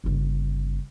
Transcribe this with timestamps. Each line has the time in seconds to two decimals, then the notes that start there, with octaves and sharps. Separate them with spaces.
0.04 G1 C#3